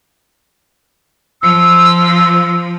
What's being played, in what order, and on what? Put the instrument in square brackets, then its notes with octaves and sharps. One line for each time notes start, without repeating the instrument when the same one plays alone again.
[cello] F3 [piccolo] E6